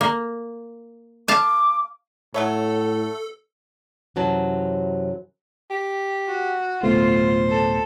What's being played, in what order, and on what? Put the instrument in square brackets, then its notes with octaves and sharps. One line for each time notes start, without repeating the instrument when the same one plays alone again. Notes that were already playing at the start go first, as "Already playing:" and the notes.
[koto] A#3
[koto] F5 A5 [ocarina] D6
[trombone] A2 [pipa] F#3 A3 C#5 [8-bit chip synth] A4
[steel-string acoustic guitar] F#2 C3 E3 F#3 A5
[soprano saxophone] G4
[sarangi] F#4
[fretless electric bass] D1 B2 A3 [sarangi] F4 [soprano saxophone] C5
[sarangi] A4